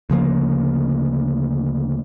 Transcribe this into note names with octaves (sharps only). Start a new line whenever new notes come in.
D2 C#3 F3 A#3